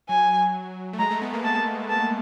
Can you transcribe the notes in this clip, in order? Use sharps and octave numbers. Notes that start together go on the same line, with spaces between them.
F#3 G#5
A3
G#3 A#5
A3
B3
A#3
A#3 A5
A5